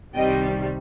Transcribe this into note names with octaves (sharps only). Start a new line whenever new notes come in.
C2 C3 D#3 G3 D#5 G5